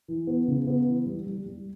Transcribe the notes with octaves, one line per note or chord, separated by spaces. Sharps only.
E3
B3
C#3
B3
E3
G3
G3
G3